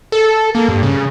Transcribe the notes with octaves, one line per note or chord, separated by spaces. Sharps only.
A4
A#3
G2
C#3